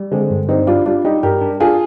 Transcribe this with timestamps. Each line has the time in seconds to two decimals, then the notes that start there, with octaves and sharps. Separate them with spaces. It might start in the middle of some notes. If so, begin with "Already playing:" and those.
Already playing: G3
0.12 D3 G#3 C4
0.31 G2
0.49 G3 C4 D#4
0.67 G3 D4 F4
0.86 G3 D4 F4
1.05 G3 D#4 G4
1.23 G2 G4 A#4
1.41 D4
1.60 D4 F4 G#4